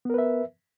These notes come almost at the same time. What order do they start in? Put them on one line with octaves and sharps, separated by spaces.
B3 A#4 B4 E5